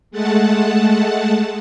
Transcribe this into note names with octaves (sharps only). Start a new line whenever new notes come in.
G#3 A3 F#5 A5